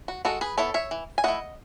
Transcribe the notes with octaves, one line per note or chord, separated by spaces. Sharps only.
F#4
G#3 F#4 A4
G#4 B4
B3 E4 A4 C#5
C#5 E5
E3
G#5
A3 E4 D#5 F#5